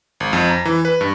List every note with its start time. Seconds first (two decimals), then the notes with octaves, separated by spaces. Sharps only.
0.20 G#1
0.33 F2
0.50 A#5
0.65 E3
0.85 B4
1.01 G2